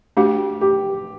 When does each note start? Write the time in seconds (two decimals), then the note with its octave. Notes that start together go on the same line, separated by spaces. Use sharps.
0.17 A3 D4 F#4 G4
0.61 G4